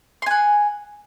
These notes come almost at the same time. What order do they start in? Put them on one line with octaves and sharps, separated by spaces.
C6 G#5 F#5